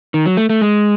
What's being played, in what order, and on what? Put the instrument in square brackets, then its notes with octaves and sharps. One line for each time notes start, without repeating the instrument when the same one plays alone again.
[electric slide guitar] D#3
F#3
A3
A3
G#3